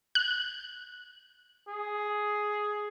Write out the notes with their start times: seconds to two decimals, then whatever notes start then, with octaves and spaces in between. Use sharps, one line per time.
0.15 F#6
1.69 G#4